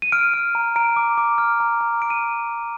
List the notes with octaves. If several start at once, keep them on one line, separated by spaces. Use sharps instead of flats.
D#7
F6 D7
F6
A#5
A#5 D7
D6
D6
F6
A#5
A#5
F6 D7
D#7